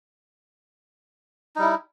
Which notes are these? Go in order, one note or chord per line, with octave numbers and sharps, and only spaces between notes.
G3 D#4 E4